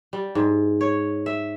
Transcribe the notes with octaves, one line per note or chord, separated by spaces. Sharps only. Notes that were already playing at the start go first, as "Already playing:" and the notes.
G3
G#2
C#5
E5